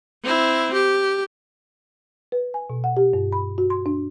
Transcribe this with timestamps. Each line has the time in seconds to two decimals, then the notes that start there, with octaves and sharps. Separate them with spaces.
0.23 C4 E4
0.73 G4
2.32 B4
2.54 G#5
2.70 B2
2.84 F#5
2.97 G4
3.13 G2
3.32 B5
3.58 F#4
3.70 C6
3.86 D4